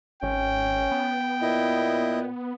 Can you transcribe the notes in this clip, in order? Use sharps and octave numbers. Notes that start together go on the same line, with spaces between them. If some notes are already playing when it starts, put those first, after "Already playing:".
G#1 C#4 G5
B3
A#2 E4 D#5